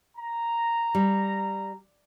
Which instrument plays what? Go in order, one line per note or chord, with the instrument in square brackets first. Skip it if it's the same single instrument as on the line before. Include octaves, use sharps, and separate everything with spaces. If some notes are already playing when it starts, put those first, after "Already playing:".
[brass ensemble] A#5
[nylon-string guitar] G3